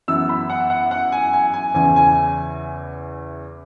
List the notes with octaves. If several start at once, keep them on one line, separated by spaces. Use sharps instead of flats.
F#2 E3 B3 E6
B5
F#5
F#5
F#5
G#5
G#5
G#5
E2 C#3 E3 G#5
G#5